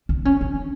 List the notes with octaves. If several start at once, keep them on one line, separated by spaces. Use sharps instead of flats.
D4
C#4
D4